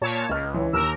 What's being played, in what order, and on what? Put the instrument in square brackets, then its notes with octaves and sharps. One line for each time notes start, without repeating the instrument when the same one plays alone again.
[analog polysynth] A#2 C#5 A5
[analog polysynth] C#2 [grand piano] D#5 F6
[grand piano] E3 C#5
[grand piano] D#2 [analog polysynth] A#4 [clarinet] E6